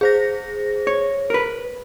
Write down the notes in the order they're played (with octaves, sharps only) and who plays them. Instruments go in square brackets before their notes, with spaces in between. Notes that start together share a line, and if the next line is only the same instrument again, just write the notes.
[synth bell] G#4 C5 A#6
[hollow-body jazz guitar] C#5
A#4 B4